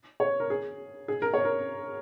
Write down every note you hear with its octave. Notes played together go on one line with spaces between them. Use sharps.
C#5
A#4
G#4
G#4
A#4
C#5
A#4